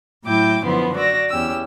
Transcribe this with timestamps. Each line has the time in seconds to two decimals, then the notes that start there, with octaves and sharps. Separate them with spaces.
0.24 A2 F#3 E4 G5 D6 G6
0.65 F#2 D3 F3 B3 E4 C6
0.95 F#4 D5 E6 A#6
1.30 E2 C#4 G4 E6